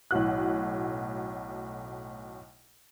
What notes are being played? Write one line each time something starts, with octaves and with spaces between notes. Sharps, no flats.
B1 A2 F#4 F#6